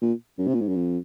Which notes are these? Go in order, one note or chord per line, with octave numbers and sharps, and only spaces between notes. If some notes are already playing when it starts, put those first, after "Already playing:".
A#2
F#2
C3
A#2
G#2
F#2
F2